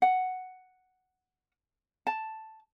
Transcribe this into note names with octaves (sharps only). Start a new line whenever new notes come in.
F#5
A5